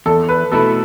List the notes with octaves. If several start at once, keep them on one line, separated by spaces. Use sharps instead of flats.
E2 A4
B4
B2 A3 E4 A4